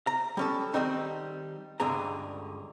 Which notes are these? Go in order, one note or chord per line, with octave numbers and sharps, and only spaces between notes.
A#5
G3 C#4 A4
D#3 F#3 G3 C4 D#4
C#2 G2 D3 G#4 A#5